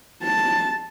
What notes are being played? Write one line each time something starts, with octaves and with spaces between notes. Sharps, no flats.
A5